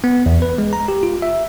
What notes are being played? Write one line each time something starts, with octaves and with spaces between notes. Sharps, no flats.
B3
E2
B4
G#3
A#5
G4
F4
E5